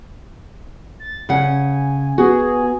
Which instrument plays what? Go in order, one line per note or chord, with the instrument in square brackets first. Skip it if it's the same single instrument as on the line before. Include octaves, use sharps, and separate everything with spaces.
[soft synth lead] A6
[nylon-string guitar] C#3 F#5 [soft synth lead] G#5
[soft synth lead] B3 [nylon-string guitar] F#4 [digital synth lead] G#4